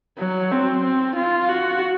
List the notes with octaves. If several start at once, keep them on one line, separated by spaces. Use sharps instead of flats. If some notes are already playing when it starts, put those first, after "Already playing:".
F#3
C4
C4
F4
F#4